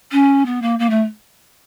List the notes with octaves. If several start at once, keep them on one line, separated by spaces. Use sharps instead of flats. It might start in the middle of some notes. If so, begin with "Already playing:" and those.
C#4
B3
A#3
A#3
A3